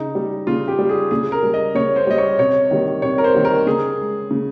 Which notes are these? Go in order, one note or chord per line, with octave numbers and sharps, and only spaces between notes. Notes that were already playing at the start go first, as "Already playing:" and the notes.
Already playing: C#3 D#4
G3
C#3 F4
G4
G3
G#4
C#3 G#4
A#4
G3
D#5
C#3 C#5
C5
G3 D#5
C#5
C3 C#5
D#3 G3
C3 C#5
A#4
C5
D#3 G3
A#4
C#3 G#4
G#3
C#3